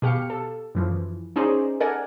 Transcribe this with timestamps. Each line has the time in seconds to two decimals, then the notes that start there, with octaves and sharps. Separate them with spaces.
0.02 B2 G4 F5 C#7
0.30 A4
0.75 F#2 E3 F3
1.36 C#4 D#4 G#4 C5 D5
1.80 A4 A#4 D5 F#5 G#5